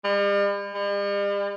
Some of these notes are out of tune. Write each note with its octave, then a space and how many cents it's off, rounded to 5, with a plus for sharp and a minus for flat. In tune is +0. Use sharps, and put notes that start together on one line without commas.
G3 +45
G3 +45